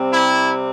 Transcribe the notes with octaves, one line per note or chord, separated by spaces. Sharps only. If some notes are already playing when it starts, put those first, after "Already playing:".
Already playing: C3 G3 C4
E4